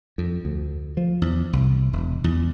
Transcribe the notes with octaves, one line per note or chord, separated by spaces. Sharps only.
F2
D2
F3
E2
C2
E1
E2